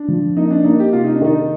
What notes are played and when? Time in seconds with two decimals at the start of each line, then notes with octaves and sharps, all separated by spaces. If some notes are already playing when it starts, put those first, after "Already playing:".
Already playing: D4
0.08 F3
0.37 A#3 D#4
0.50 D4
0.64 A#3 D#4
0.80 G4
0.93 C3 F4
1.04 D#4
1.15 D4
1.21 D#3 D#4